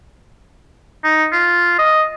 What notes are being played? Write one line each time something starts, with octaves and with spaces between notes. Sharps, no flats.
D#4
F4
D#5